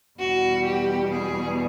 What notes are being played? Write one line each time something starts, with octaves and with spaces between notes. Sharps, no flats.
E2 B2 G3 F#4
G4
G#4